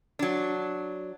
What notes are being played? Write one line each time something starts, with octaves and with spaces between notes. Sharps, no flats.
F#3 D4